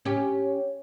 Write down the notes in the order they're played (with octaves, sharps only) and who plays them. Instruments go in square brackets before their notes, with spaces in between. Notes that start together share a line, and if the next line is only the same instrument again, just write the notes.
[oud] C#4 G4